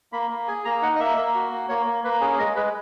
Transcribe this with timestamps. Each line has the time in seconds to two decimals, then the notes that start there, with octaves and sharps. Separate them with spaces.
0.12 A#3 B5
0.31 A#3
0.48 G#4 G#5
0.65 A#3 A#5
0.82 D#4 F#5
0.95 D#5
0.99 A#3 E5
1.17 A#3
1.35 F#4
1.52 A#3
1.69 A#3 C#5
1.86 A#3
2.04 A#3 B4
2.21 C#4 G#4
2.32 G#4
2.39 G#3 A#4
2.56 G#3 B4